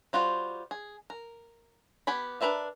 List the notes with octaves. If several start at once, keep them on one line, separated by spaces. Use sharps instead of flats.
G3 F4 F#4 C5
G#4
A#4
B3 G4 G#5 B5
D4 A#4 B4 E5 F5